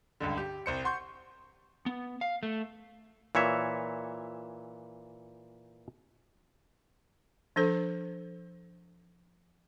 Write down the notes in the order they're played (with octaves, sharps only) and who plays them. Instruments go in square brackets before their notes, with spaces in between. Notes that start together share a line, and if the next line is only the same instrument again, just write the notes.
[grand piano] C#2 G2 D3
G4
C2 C5 C#7
F#5 C6 C#6 G6
[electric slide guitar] B3
F5
A3
[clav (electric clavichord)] A#2 E3 C#5 E5
[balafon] F3 D4 A4 C5